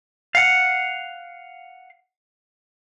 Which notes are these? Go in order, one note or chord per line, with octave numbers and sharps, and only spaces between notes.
F5 F#5